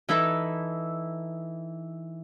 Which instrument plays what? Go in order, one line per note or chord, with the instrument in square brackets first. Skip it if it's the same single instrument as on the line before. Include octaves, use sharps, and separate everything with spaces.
[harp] E3 D#4 E4 A4 B4 E5